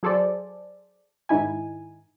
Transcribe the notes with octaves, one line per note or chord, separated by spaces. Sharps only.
F#3 G#4 A4 C5 D5
G#2 D#3 D#4 E4 G#5